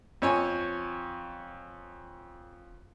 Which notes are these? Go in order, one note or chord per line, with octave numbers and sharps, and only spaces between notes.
F2 C#5 G#5